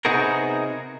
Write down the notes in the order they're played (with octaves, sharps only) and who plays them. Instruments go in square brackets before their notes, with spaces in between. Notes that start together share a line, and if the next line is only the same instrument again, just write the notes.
[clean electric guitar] C3 B3 D#4 F#4 G#4 A#4